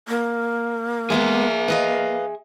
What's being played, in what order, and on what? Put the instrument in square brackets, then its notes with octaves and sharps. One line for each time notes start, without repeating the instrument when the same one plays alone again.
[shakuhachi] A#3
[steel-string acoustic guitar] G#3 A3 B3 [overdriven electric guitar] G#4 E5
[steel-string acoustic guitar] B4 D#5 F5